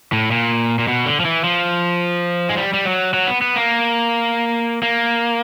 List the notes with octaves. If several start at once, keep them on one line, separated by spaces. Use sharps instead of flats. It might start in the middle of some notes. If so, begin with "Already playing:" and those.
A2
A#2
A#2
B2
D3
F3
E3
F3
G#3
G3
G3
F#3
F#3
B3
B3
A#3
A#3